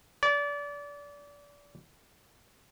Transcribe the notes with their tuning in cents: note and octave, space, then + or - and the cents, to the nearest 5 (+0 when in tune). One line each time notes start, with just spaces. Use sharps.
D5 -30